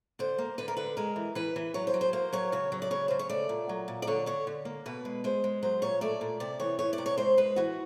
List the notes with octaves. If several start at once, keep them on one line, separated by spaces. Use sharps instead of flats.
D3 C5
A#3
D3 B4
A#4
D3 B4
G#3 A#4
E3
E3 B4
E3
F#3 C#5
C5
F#3
C5
A#3 C5
F#3 C#5
C#3 C#5
F#3
D5
C#3 C#5
C#3 C5
C#5
A3 D5
A#2
F#3
A#2
D5
D3 C#5
D3 C#5
D3
A#3
B2 B4
G#3
G#3 C5
G#3
F#3 C5
A#2 C#5
A3 D5
A#2
C3 D5
E3 C#5
E3 C#5
D5
C3
C#5
G#3 C5
G#3 B4
E3 F#4